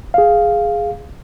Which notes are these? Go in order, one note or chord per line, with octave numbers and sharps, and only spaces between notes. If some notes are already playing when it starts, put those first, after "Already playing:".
G#4 F5